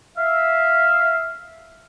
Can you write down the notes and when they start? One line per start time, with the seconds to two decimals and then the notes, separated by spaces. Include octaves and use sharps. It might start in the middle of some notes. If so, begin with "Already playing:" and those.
0.17 E5 F5